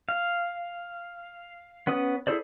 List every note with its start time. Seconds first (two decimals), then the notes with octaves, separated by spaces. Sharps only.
0.09 F5
1.87 B3 C#4 B4 D#6
2.27 E4 G#4 A4 C5 D5